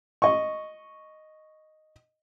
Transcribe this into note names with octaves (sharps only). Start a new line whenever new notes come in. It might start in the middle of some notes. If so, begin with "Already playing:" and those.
D#5 C#6